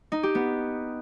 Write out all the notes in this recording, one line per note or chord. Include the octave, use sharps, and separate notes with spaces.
D#4
G4
B3